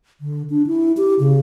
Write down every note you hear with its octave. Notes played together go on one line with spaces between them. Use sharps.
D3
D4
E4
G4
C#3